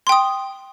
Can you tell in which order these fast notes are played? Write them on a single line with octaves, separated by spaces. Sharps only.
C6 G5 D#6